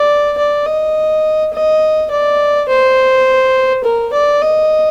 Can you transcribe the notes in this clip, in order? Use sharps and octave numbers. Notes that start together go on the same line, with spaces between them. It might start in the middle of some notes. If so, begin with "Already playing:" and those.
Already playing: D5
D5
D#5
D#5
D5
C5
A#4
D5
D#5